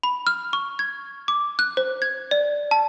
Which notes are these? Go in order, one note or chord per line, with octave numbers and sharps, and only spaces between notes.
B5
F6
C#6
G#6
D6
F#6
C5
G#6
D5
A5